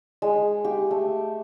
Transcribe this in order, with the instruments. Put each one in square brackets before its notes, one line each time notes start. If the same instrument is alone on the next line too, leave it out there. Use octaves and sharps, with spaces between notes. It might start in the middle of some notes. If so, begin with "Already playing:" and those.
[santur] G#3
G4
A3